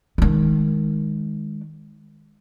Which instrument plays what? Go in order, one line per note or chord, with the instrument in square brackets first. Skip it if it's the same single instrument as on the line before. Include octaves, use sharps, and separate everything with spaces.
[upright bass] D#3 G#3